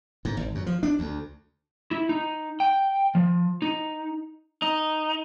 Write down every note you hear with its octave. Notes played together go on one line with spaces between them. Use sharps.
G#2
G#1
F#2
F3
D4
D2
E4
D#4
G5
F3
D#4
D#4